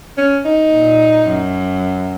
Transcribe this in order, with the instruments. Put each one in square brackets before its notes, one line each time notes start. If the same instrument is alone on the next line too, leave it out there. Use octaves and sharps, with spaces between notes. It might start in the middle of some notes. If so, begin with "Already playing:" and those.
[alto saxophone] C#4
D#4
[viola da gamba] A#2
F#2